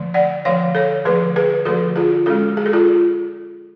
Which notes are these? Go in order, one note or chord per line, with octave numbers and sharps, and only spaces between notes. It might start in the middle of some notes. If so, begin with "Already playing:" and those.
Already playing: D3 F3 A3
D5 F#5
D3 F3 A3 C#5 F5
A4 C#5
D3 F3 A3 G#4 B4
G#4 B4
D3 F3 A3 F#4 A4
F4 G#4
G#3 C#4 F#4 A4
G#4
A4
F4 G#4